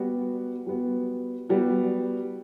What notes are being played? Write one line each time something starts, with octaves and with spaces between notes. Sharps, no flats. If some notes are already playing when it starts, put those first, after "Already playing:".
Already playing: G3 B3 F#4
G3 B3 F#4
G3 B3 F#4